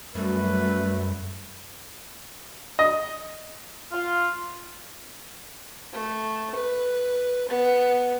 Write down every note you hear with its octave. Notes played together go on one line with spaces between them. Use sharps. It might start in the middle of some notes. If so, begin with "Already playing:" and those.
F#2 G3 A3 B4
D#5
F4
A3
B4
B3